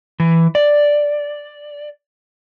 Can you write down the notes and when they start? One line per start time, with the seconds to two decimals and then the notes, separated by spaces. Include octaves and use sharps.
0.20 E3
0.55 D5